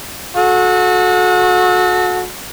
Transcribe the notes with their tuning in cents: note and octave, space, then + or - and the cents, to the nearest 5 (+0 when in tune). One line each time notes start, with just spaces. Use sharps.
F#4 -30 A4 -30